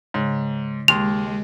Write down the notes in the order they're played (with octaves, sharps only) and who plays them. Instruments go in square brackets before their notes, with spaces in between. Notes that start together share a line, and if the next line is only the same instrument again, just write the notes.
[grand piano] G#2 [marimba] C#3
[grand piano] D#2 C6 [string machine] G#3 [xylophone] F7